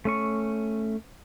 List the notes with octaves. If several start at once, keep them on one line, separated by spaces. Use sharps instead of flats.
A3 C#4 C#6